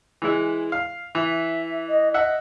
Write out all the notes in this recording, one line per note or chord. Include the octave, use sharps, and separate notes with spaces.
E3 G#3 E4
F5
E3 E5
D#5
D#5 E5 F#5